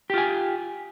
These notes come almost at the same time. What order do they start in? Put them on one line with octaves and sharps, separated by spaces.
G4 F4 G#5